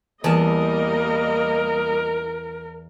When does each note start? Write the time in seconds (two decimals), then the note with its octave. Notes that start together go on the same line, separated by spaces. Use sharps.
0.24 E2 G3 A#3 A#4 D#5 A5